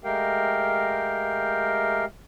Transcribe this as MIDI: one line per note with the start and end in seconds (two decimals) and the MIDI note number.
0.04 2.05 56
0.04 2.05 57
0.04 2.05 67
0.04 2.05 70
0.04 2.05 77
0.04 2.05 79